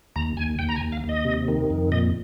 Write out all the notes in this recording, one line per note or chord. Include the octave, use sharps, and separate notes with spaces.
D#2 A#5
D#2 G#5
D#2 G5
A#5
G#5
D#2
F5
D#2
D#5
C3
D#3
F2
A#2 D#5